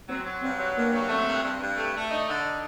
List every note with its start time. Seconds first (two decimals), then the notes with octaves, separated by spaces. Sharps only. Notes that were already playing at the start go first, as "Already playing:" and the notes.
0.08 F#3 C4
0.25 F#3
0.42 G2 C4
0.60 F#3
0.75 G2 A#3
0.93 F#3
1.09 A3 C4
1.27 G2
1.43 G2
1.60 G2
1.77 A3
1.94 A3
2.10 D4 D#4
2.28 D3
2.44 D#4